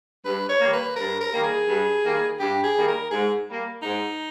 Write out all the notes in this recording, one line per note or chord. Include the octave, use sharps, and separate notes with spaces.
G2 B4
C#5
D#3 G3 A#3
B4
G2 A#4
A#4
D#3 G3 A#3
G#4
G2
D#3 G3 A#3
G2 G4
G#4
D#3 G3 A#3
A#4
G#2 G#4
G3 A#3
G#2 D#4